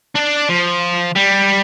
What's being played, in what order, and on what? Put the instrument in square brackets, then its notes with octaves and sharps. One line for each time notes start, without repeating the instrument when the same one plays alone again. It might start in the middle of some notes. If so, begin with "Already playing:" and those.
[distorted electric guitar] D4 D5
F3
G3